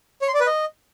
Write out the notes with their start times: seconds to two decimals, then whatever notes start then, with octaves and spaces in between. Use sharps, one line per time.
0.22 C#5
0.28 C6
0.34 D5
0.40 B4
0.47 D#5